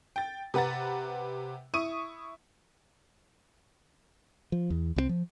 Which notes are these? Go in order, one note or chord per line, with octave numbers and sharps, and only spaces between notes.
G5 A6
C3 B4 F#5 A#5 A6
E4 C#6 D#6 D#7
F3
E2
C2 F#3 C4
F3